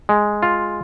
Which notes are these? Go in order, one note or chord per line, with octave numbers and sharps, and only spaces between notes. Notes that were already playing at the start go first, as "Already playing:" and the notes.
G#3
F4